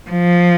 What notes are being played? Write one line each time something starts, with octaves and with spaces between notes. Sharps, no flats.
F3